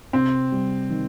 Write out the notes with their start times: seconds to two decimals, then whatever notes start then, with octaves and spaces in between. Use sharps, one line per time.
0.13 C3 C4
0.52 G3
0.90 D#3